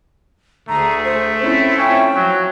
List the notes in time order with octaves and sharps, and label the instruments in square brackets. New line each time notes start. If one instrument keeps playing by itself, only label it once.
[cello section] D2 G#4 [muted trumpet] A3 [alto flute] A#5
[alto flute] C5
[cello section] C4 E4 F4 [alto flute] C#4
[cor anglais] C#4 [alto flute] G5
[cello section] F3 [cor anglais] F#3